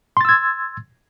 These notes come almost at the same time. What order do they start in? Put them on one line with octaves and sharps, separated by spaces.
C6 A6 E6 G#6